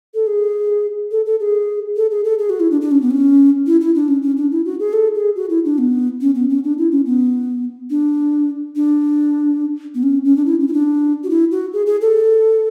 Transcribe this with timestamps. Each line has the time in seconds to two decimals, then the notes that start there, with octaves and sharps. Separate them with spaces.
0.15 A4
0.27 G#4
1.11 A4
1.26 A4
1.40 G#4
1.97 A4
2.11 G#4
2.25 A4
2.39 G#4
2.50 F#4
2.60 E4
2.71 D4
2.81 D4
2.91 C#4
3.02 B3
3.11 C#4
3.67 E4
3.81 E4
3.95 D4
4.08 C#4
4.22 C#4
4.37 D4
4.51 E4
4.66 F#4
4.80 G#4
4.93 A4
5.15 G#4
5.36 F#4
5.50 E4
5.65 D4
5.78 B3
6.21 C#4
6.35 B3
6.50 C#4
6.64 D4
6.78 E4
6.91 C#4
7.06 B3
7.90 D4
8.76 D4
9.95 B3
10.03 C#4
10.25 C#4
10.36 D4
10.46 E4
10.60 C#4
10.68 E4
10.73 D4
11.24 F#4
11.30 E4
11.51 F#4
11.73 G#4
11.87 G#4
12.01 A4